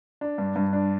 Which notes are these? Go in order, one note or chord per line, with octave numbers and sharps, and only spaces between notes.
D4
G2
G2
D4